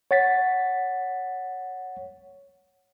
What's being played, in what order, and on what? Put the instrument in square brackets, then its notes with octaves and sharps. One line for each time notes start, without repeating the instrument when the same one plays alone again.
[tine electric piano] C#5 F#5 A6 B6